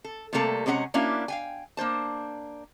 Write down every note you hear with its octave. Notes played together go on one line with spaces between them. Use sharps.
A4
C3 G3 A3 A#3 A4 A#5
C3 G#3 C#4 G#4 F#5 A#5
A#3 C#4 D4 E4 F#4 F5
F5 G5 G#5
A#3 D4 C5 A5